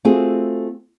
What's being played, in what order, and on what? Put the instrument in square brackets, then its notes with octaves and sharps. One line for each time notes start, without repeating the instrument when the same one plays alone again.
[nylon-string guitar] A3 C4 F4 F#4 G#4